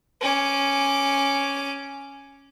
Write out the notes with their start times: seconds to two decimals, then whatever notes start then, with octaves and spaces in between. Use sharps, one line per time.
0.21 C#4 D6